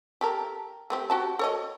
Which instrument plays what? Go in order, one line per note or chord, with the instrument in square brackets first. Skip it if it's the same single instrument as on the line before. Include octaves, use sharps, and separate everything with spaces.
[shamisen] G4 A4 A#4
A3 C4 G4
F#4 G4 A5
A4 C#5 D#5